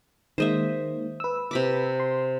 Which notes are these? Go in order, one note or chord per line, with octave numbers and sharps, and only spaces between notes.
D#3 G#3 A#3 C5 D#5 E5
B4 E6
C3 B5 D6
C6